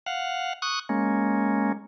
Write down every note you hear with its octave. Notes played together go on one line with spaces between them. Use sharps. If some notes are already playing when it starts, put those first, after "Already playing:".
F5 F#5
C#6 D#6 F#6
G#3 A#3 C#4